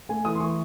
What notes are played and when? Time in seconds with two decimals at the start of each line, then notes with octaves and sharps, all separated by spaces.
0.09 A3 G#5
0.25 E3 D#6
0.35 C6
0.40 E3 C#6